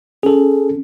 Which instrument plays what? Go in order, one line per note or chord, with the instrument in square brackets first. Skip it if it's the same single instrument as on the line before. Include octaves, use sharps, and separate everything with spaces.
[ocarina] C#4 [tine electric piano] G#4 A4